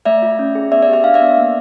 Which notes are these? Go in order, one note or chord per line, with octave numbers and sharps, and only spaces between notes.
A3 D5 E5
F4
C#4
G#4
B3 D5 E5
D5 E5
G4
E5
D4 F5
D5 E5
B3
A#3